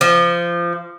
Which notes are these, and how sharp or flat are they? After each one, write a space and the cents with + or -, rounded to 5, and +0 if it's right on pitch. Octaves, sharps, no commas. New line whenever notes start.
F3 -20